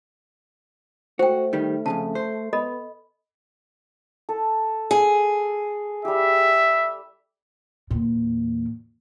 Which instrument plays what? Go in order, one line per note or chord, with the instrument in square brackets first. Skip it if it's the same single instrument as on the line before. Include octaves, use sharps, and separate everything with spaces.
[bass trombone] A3 [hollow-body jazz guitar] F#4 [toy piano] C5 G5
[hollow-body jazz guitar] D#3 G3
[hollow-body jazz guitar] F2 G#2 C#3 [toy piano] A5
[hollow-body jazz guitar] C5
[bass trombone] B3 [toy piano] A4 D#5 B5
[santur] A4
[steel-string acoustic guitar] G#4
[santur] G3 G4 [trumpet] E5
[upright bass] E2 A#2